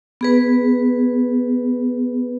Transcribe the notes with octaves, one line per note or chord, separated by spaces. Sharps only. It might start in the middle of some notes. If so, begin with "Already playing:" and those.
B3 G#4 B4